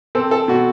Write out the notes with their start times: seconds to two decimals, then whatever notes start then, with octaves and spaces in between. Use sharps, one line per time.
0.15 C4 A4
0.31 A4
0.48 B2 F#4